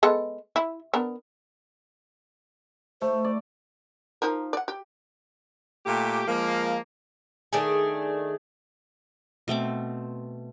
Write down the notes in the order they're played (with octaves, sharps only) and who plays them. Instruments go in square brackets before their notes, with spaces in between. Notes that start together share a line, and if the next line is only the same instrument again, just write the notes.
[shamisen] G#3 B3 A4
E4
B3 D4 A#4
[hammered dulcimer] A3 [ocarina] C5
[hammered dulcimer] D5
[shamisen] F3 D#4 A#4
D5 F#5
G4
[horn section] A#2 A3 G4
F3 G#3 A#3
[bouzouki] D#3 A3 D4 G#4
[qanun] B2 A3 C4 D6